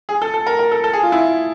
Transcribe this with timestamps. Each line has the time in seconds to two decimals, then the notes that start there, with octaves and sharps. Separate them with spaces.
0.09 G#4
0.22 A4
0.34 A4
0.47 A#4
0.59 A#4
0.72 A4
0.84 A4
0.93 G#4
1.03 F4
1.12 E4